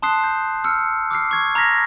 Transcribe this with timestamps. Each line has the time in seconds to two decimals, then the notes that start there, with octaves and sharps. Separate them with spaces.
0.02 A5 C6 D#6 F#6 C7
0.24 G6
0.64 E6 F6 C#7
1.11 D6 E6 F6 C7
1.31 C#6 G#6
1.55 A#5 F6 G#6 A#6 B6